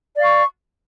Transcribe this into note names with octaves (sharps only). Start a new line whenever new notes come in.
D5 F5 C#6